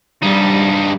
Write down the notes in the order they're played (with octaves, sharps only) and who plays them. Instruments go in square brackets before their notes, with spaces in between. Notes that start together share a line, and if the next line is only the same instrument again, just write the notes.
[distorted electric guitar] G2 D#4 [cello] G3